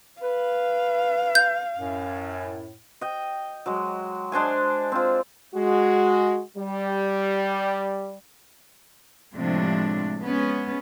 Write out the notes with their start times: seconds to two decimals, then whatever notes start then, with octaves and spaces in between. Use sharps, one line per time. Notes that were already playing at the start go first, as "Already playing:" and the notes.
0.21 B4 F5
1.35 G6
1.77 F#2 A2
3.01 D#5 G5
3.66 F#3 G#3
4.32 G#3 D4 C5 G#5
4.92 C4 F4
5.55 G#3 F#4
6.57 G3
9.35 A2 C3 F3 G#3 D4
10.21 G#3 B3 C#4